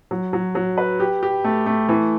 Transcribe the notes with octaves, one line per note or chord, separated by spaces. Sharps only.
F#3
F#3
F#3
B4
G4
G4
A3
A3
E3